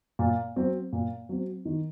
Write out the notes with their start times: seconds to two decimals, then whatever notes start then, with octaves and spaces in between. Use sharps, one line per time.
0.19 A#2
0.56 F#3 C4
0.93 A#2
1.29 F#3 C4
1.65 D#3